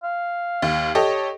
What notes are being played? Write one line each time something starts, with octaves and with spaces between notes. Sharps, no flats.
F5
D#2
G4 A4 C#5 D#5